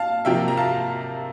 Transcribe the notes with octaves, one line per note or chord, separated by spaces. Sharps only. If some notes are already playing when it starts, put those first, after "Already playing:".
Already playing: F5 A5
C3 F3 A#3 E5 G5
A#5
F5 A5